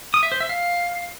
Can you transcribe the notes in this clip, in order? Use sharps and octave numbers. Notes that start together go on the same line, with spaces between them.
D#6
E5
C5
E5
F5